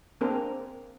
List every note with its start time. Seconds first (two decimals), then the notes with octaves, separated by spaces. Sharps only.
0.21 A#3 C4 D4 G#4 A#4